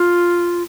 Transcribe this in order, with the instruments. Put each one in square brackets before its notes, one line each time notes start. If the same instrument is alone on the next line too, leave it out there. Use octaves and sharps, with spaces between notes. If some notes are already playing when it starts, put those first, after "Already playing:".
Already playing: [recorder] F4